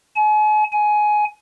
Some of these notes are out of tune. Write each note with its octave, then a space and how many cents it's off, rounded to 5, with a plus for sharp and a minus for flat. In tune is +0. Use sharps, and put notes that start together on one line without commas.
G#5 +40
G#5 +15